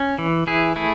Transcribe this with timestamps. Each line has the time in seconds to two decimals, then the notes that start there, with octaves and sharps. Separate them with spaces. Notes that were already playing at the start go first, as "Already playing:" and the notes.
Already playing: C#4
0.19 E3
0.47 E3 E4 G#4
0.76 A3 E4 G#4